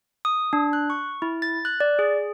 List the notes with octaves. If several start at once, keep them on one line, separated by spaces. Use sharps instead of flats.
D#6
D4
F#6
C#6
E4
A6
F#6
D5
G#4